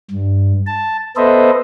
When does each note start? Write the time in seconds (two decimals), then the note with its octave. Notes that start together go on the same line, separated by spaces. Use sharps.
0.11 G2
0.66 A5
1.17 B3 A4 B4 C5 D#5 E5